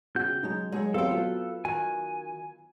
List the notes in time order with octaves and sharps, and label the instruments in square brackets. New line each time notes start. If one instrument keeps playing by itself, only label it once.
[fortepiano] C#3 [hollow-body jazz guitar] F#4 G5 [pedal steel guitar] G6
[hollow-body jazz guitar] F#3 G#3 D#4
[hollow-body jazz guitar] F#3 G#4 C#5 [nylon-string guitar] G#3
[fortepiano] B1 C4 G4 [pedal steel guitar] A4 [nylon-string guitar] F5 G5
[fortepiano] F#3 B3 B4 [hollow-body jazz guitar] F4
[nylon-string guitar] D#3 F#4 [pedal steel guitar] G#5